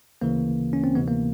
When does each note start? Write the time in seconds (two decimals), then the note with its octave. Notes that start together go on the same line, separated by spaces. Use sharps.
0.21 D2 C#3 E3 A#3
0.73 C#4
0.84 C4
0.95 D2 C3 E3 B3
1.08 A#3